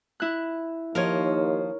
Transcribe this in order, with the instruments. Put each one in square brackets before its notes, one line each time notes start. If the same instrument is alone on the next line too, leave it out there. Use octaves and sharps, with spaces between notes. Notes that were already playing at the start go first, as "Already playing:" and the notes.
[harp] E4 F#6
[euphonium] D#2 [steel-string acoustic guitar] F3 D#4 C5 [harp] A#4 C#5